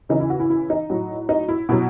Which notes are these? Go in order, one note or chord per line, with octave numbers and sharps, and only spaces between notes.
C#3 E3 D#4
E4
F#4
E4
E4
D#4
A2 F#3
D#4
E4
B2 F#3 E4